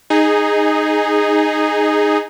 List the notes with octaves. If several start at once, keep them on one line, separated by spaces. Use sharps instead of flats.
D#4 G#4